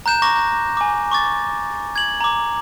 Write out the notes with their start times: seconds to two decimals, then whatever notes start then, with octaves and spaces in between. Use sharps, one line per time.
0.06 A#5 F#6 G6 E7
0.22 A#5 C#6 D6 A#6
0.77 G#5 D6
1.11 C#6 D6 A6
1.96 G#6 F#7
2.21 A#5 D6